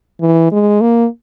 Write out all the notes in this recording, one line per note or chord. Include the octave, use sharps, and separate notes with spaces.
E3
G#3
A#3